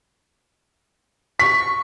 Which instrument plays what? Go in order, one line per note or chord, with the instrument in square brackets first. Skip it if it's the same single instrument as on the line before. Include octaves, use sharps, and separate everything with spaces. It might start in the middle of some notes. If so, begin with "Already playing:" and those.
[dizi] C#6 [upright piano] B6